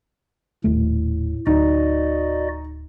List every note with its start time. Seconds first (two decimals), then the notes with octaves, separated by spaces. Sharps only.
0.64 D#1 A2 A3
1.46 D1 D#4 F#4 D5 D#5